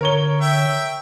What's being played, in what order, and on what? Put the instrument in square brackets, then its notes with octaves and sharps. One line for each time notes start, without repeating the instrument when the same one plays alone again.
[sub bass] D3 [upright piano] A#4 C#5 G7
[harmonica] E5 G5